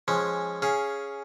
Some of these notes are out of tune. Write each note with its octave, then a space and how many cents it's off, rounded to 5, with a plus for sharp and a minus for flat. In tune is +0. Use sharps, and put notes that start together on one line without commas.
F3 +0 G#3 +0 C#4 -10
C#4 +0 G#4 +0 F5 +0